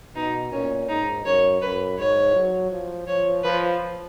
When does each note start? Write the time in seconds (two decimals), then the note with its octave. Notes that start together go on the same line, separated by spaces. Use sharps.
0.15 B2 D#4
0.52 A#2 C#4
0.89 G#2 D#4
1.26 F#2 C#5
1.61 F#2 B4
1.98 G#2 C#5
2.34 F#3
2.72 F3
3.07 F3 C#5
3.44 F3 B4